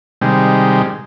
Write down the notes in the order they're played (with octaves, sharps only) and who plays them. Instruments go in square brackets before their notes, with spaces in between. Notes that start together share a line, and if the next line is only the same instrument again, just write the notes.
[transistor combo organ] C3 D#3 G3 G#3